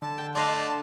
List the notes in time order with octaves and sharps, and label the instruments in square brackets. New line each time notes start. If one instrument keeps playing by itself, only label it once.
[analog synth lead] D3 [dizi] A5
[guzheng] G5
[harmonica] A3 D5 C6 [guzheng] D4 D#5 F5 [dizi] A5